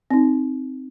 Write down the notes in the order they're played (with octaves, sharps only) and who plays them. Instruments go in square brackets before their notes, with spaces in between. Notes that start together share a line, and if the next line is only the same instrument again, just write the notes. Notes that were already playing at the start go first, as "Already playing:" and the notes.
[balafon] C4 D#4